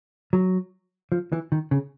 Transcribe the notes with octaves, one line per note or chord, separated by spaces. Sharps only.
F#3
F3
E3
D#3
C#3